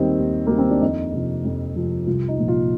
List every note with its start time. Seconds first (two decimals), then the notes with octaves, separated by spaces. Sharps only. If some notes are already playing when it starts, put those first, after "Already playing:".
Already playing: D#2 D#3 G3 C4
0.18 D#2
0.47 D#3 G3 A#3
0.58 C4
0.70 D4
0.81 F2 D#4
1.13 C3 F3
1.45 F2
1.75 C3 F3
2.06 C2 F4
2.28 D#4
2.39 A#2 F3
2.48 F4